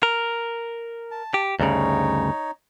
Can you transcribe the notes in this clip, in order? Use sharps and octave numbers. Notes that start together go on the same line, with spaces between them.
A#4
A5
G4
D2 G2 C#3 D#4 C#5